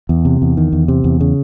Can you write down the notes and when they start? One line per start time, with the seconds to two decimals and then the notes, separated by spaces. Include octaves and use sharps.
0.09 E2
0.25 C3
0.42 E2
0.57 D#3
0.72 E2
0.88 C3
1.04 E2
1.21 C#3